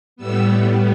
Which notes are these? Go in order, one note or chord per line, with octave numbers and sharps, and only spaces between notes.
A2 G3 B3 E6